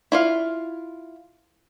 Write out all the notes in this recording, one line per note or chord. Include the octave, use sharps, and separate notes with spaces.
E4 F4 F5